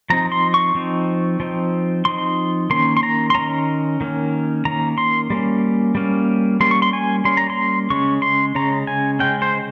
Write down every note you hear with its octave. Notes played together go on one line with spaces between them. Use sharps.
F3 C4 D#4 A#5
C6
C#6
F3 C4 D#4
F3 C4 D#4
F3 C4 D#4 C6
D#3 A#3 C#4 C6
C6
A#5
C6
D#3 A#3 C#4 A#5
D#3 A#3 C#4
D#3 A#3 C#4 A#5
C6
G3 A#3 C#4
G3 A#3 C#4
G3 A#3 C#4 C6
C#6
C6
G#5
G3 A#3 C#4 C6
A#5
C6
C#3 G#3 C#4 C#6
C6
C#3 G#3 C#4 A#5
G#5
C#3 G#3 C#4 G5
C5